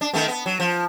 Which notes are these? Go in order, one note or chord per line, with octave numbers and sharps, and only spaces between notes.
D4
D#3 A3 B3
B3
F#3
F3